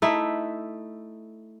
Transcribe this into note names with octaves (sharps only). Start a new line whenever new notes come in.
A3 D#4 E4